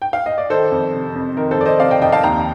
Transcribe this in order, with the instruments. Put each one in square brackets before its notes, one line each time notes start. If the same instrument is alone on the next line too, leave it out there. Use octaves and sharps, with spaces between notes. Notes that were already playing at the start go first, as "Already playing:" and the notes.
[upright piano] G5
F5
D#5
D5
D#3 A4 C5
F2
C3
F2
D#3 A#4
A4 C5
F2 D5
C5 D#5
C3 D5 F5
D#5 G5
F2 D#5 G5
F5 A5
D#2 G5 A#5